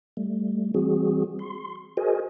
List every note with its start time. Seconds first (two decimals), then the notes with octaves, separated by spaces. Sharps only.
0.17 G3 A3
0.74 E3 G3 C4 F#4 G#4
1.39 C6
1.97 F#4 G#4 A#4 C5 D#5 G#5